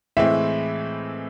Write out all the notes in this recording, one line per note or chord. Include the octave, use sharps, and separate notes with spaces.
A2 E3 G#3 C4 E5